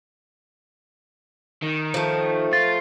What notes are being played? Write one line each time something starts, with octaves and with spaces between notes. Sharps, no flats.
D#3
F3 A3
F4 A6